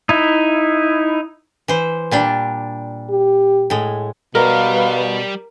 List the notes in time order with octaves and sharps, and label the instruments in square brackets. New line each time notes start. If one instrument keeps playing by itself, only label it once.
[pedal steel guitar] D#4 E4
[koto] E3 C5
A#2 G3 D4
[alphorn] G4
[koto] A2 G#3
[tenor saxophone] B2 [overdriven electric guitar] G3 D5 [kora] A#4 [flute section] B4 F5